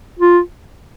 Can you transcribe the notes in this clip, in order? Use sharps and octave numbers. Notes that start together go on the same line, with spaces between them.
F4